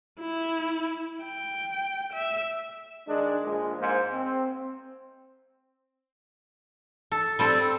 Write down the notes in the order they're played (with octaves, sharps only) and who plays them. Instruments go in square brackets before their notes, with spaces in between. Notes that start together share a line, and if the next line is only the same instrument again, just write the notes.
[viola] E4
G5
E5
[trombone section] D#3 G#3 D4
A#1 G#3
G#2 A#3 C5
C4
[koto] A4
G3 C4 A4